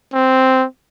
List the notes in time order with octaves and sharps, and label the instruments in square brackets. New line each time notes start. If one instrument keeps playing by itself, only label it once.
[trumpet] C4